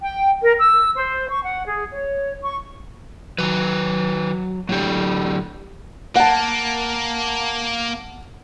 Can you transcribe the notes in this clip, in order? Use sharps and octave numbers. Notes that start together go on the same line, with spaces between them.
G5
A#4
E6
C5
C#6
F#5
G#4
C#5
C#6
D#3 F#3 B4
A2 D3 F#3 G4
A#3 F#5 A5